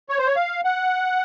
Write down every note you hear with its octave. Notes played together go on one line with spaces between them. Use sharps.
C#5
C5
C#5
F5
F#5